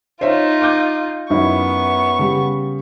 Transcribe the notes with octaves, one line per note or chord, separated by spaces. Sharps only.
D#4 F4 C5 C#5 E5
D6 G6
F#2 B3 D#4 E4 C#6
C#3 G3